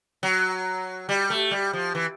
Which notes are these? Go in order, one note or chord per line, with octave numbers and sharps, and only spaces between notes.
F#3
G3
A3
G3
F3
E3